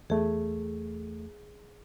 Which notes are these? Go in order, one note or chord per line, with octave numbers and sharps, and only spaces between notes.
E2 A3 G#4